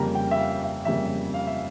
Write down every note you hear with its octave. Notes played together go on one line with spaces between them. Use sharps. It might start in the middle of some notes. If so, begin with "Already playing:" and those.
Already playing: F2 C#3 G3 A#3 A#5
G5
E5
F5
E5
F2 C#3 G3 A#3 E5
F5
E5